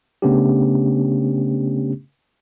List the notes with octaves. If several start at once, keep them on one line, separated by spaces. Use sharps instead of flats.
C#3 A3 B3 C#4 D4 G4